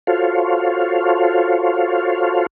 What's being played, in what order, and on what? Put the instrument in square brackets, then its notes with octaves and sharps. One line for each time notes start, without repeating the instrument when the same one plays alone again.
[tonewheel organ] F4 F#4 A4 C5 C#5 F5